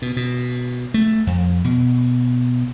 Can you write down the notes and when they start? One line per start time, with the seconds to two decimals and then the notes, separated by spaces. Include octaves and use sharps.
0.02 B2
0.17 B2
0.94 A3
1.27 F2
1.64 B2